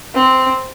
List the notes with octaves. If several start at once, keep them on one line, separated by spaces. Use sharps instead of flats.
C4